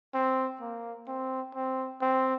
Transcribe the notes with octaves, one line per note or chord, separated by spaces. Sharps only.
C4
A#3
C4
C4
C4